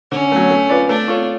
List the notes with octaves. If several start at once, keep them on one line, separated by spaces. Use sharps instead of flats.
D3 C#4
F#3 A3
A3
F4 B4 D5
A3 D4
F4 A4 C#5